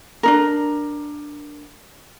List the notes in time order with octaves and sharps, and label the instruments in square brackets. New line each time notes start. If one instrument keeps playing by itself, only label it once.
[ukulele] D4 D#4 A#4